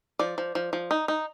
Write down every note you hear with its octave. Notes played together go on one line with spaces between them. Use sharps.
F3 D5
F3
F3
F3
D#4
D#4